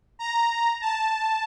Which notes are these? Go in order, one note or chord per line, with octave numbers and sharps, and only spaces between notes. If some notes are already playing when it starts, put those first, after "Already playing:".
A#5
A5